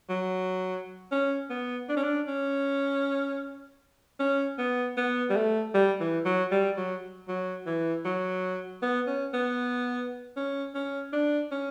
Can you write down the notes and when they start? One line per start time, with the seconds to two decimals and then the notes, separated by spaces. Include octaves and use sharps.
0.09 F#3
1.12 C#4
1.50 B3
1.89 D4
1.97 C#4
2.03 D4
2.27 C#4
4.20 C#4
4.58 B3
4.97 B3
5.30 G3
5.36 A3
5.74 G3
6.00 E3
6.25 F#3
6.51 G3
6.77 F#3
7.28 F#3
7.66 E3
8.05 F#3
8.82 B3
9.07 C#4
9.34 B3
10.36 C#4
10.75 C#4
11.13 D4
11.52 C#4